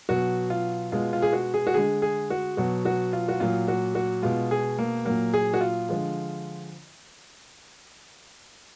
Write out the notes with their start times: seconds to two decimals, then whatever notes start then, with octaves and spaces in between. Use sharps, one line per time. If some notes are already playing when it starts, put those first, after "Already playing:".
0.09 B2 F#3 F#4
0.50 F4
0.92 B2 G#3 F4
1.13 F4
1.22 G#4
1.33 F#4
1.54 G#4
1.67 F#4
1.74 D3 G#3 G#4
2.02 G#4
2.30 F#4
2.57 B2 F#3 F#4
2.85 F#4
3.13 F4
3.29 F#4
3.40 A#2 F#3 F4
3.68 F#4
3.95 F#4
4.22 B2 G#3 F4
4.51 G#4
4.79 A#3
5.05 A#2 F#3 A#3
5.34 G#4
5.54 F#4
5.61 F4
5.89 D3 F3 G#3